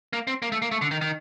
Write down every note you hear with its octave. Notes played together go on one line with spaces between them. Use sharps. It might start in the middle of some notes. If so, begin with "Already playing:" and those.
A#3
C4
A#3
A3
A#3
A3
D3
D#3
D#3